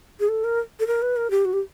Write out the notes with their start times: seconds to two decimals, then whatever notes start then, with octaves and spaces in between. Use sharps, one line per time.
0.20 G#4
0.29 A4
0.44 A#4
0.80 A4
0.87 A#4
1.02 B4
1.16 A#4
1.31 G4
1.45 F#4
1.53 G4